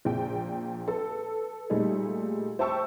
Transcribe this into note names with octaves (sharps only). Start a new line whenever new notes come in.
A#1 A#2 G5
A4 B4 A5
A#2 G3 A3 D#4 G#4
C5 E5 G5 A5 C#6 E6